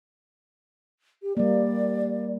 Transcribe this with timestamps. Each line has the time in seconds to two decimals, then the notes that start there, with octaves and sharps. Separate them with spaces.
1.23 G4
1.37 G3 A#3 D5